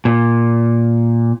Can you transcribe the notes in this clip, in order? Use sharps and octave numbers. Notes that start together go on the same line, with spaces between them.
A#2